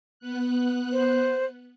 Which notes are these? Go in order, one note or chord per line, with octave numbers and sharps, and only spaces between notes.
B3 F#6
C5